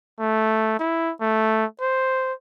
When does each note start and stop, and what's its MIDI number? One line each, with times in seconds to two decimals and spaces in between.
0.20 0.76 57
0.79 1.12 64
1.21 1.65 57
1.81 2.33 72